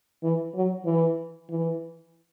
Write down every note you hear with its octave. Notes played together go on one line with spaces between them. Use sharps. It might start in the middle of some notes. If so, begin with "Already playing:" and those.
E3
F#3
E3
E3